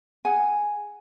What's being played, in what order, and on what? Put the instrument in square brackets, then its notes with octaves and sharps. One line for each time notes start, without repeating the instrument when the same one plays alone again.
[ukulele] G#4 F#5 G#5